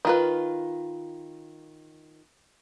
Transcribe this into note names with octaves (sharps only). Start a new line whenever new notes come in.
D#3 F4 B4